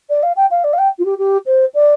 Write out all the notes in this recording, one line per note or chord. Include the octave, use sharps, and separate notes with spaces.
D5
F5
G5
F5
D5
F5
G5
F4
G4
G4
C5
D5